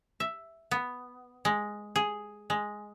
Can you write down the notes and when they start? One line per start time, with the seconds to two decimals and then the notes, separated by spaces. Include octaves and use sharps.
0.20 E5
0.71 B3
1.45 G#3
1.96 G#4
2.50 G#3